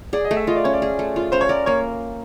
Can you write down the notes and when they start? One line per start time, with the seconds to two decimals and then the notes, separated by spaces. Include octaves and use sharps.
0.13 G#4 D5
0.25 D#5
0.31 A3
0.37 E5
0.47 F4 D#5
0.56 D5
0.64 C#4 C#5
0.73 D5
0.82 G#4
0.99 A3
1.16 F4
1.32 C#4 C5
1.41 C#5
1.49 A#4 D5
1.66 A#3 C#5